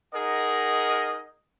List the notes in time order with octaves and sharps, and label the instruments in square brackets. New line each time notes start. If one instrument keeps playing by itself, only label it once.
[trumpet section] D#4 G#4 A#4 D#5 F#5